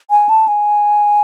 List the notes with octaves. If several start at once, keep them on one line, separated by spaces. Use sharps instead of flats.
G#5
A5
G#5